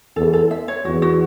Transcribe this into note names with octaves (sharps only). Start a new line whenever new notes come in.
E2 A4
A4
E5
C#5
E2 F#4
F#4